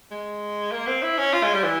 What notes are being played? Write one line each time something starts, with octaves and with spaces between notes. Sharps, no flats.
G#3
A#3
C4
E4
C#4
F4
G#3
G3
E3